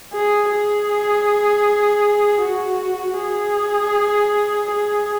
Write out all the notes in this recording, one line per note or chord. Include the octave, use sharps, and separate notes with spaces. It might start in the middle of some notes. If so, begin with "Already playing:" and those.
G#4
G#4
F#4
G#4
G#4